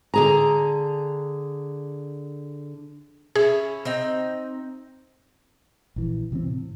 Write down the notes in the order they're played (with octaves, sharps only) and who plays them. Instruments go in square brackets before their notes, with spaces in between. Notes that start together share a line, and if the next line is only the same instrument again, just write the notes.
[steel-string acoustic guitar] D3 G#4 A#5
[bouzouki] C#4 E4 [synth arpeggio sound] G#4
[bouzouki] C4 D#4 G5
[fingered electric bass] A#1 E3
C3 E3 B3 C4
A2